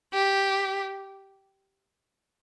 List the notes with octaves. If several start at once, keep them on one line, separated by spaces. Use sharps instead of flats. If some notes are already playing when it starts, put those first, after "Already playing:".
G4